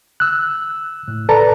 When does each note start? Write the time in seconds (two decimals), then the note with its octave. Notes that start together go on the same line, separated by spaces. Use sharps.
0.20 E6 F#6
1.08 A2
1.29 A4 B4 D5 A5 A#5